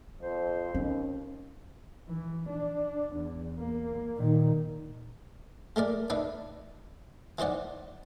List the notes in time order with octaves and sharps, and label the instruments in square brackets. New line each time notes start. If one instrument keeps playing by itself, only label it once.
[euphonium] F2 [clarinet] C5
[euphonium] D#2 [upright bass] C#4
[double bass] E3
D4
E2
A#3
A#2 D#3
[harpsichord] G#3 A3 A#4 D5
D4 D#4 B4 E5
E3 D#4 C5 D5 F#5